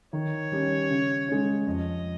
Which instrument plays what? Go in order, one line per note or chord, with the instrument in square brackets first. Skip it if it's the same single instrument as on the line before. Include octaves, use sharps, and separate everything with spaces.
[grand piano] D#3 [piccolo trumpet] C#5
[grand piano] G3 C#4 G4
C#3
G#3 C#4
[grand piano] F2 [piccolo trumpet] D#5